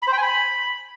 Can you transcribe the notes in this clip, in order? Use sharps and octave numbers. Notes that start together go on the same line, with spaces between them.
B5
C5
G5
G#5
B5